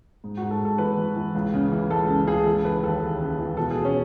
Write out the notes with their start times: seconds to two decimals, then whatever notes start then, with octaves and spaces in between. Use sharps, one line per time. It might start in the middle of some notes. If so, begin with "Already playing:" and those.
0.24 G#2
0.37 F#4
0.42 G#2
0.51 A4
0.61 G#2 A4
0.78 E3 B4
0.97 E3
1.16 E3
1.35 C#2
1.54 C#3
1.71 E3
1.90 C#2 A4
2.08 C#3
2.27 C#2 G#4
2.46 E3 A4
2.64 C#3 B4
2.83 D#2 A4
3.01 D#2
3.19 C#3
3.38 E3
3.56 B2 A4
3.71 G#4
3.75 B2
3.85 C#4